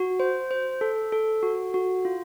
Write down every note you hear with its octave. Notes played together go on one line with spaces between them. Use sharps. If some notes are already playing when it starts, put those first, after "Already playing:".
Already playing: F#4
C5
C5
A4
A4
F#4
F#4
F4